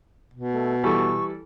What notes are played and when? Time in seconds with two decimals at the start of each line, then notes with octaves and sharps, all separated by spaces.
0.34 B2
0.52 A3
0.84 E3 G3 A4 C#6